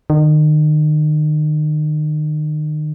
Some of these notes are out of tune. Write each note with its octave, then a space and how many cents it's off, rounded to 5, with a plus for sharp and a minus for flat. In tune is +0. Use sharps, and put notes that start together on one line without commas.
D#3 -35